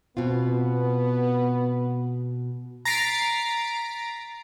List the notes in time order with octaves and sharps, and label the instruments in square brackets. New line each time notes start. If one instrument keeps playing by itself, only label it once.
[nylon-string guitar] B2 C4 F4 [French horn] B3
[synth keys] A#5 A6 B6 C7 D7